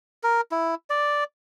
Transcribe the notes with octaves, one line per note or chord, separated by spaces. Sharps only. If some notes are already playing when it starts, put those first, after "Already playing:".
A#4
E4
D5